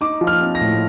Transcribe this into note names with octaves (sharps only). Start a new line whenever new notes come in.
D#4 D6
F3
F6
C4
A#6
A2